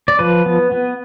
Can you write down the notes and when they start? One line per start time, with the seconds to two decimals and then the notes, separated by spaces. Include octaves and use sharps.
0.08 D5
0.19 F3 B4
0.46 B3
0.72 B3